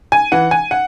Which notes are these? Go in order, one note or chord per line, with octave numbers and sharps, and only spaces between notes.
G#5
E3 F#5
G#5
F#5